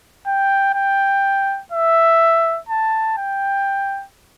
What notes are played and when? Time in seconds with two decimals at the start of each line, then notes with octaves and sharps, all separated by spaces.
0.27 G5
0.74 G5
1.72 E5
2.69 A5
3.18 G5